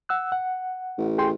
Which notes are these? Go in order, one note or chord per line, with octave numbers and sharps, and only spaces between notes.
F#5 E6 F#6
F#5
A1
G#4 G5 C6